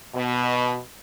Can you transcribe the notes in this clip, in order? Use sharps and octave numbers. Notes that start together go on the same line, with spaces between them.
B2